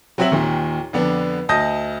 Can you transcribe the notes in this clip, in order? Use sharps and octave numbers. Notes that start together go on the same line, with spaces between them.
F#3 C4 F#4 C#5 E5 F#7
D#2 A#2 D#3
F2 D3 B3 D4
D2 D#5 A5 D#6 G6 A#6